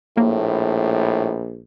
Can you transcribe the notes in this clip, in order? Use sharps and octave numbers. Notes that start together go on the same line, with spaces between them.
A#1 A2 A#3